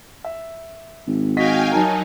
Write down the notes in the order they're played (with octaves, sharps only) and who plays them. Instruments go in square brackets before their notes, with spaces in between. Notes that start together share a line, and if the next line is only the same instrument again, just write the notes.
[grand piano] E5
[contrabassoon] G#1
[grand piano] F#4 D#5 B6 [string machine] F5 G5 G#5
[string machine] F#3 D#4 [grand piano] A#4 G#5 A5